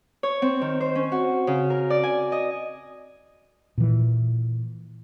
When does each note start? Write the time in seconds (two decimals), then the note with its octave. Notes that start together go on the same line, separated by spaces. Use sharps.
0.23 C#5
0.42 C4
0.61 D#3
0.81 C5
0.95 C#4
1.12 F#4
1.47 C#3
1.70 A#4
1.90 D5
2.03 G#5
2.32 D#5
3.78 A#2 E3